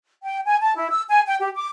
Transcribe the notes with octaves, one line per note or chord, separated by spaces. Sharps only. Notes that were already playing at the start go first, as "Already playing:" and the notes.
G5
G#5
A5
E4
E6
G#5
G5
G4
D6